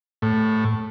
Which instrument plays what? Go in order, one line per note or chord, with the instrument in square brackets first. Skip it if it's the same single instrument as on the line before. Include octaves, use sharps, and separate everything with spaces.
[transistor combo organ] A2